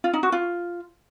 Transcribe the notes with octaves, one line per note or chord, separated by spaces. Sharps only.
F4
D#4
F#4
F4